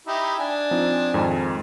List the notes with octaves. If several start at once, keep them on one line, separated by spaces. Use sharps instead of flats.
D#4 E4 G4
D4 G#5
F3 C4 D#4
F2 G#2 D#3